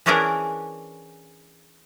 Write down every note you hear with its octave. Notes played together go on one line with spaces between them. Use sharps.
E3 C#4 D4 G#4 A#4 D5